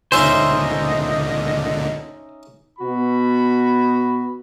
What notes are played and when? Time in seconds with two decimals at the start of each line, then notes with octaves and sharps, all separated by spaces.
0.12 C#2 A#2 D3 C#4 D#4 C5 D#5 E5
2.79 B2 F#4 B5